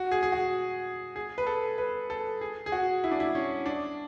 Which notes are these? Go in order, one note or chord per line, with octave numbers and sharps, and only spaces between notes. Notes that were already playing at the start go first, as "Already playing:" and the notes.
Already playing: F#4
G#4
G#4
F#4
G#4
B4
A4
B4
A4
G#4
G#4
F#4
E4
D4
E4
C#4
D4